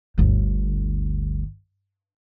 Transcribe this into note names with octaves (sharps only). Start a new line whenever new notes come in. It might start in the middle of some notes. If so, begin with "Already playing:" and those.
G1 D2